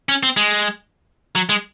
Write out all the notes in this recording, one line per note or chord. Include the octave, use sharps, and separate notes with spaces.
C#4
C4
G#3
F#3
G#3